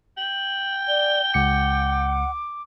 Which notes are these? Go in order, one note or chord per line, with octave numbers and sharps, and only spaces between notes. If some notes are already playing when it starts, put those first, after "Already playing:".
G5 F#7
D5 G7
C#2 F#5 D6 C#7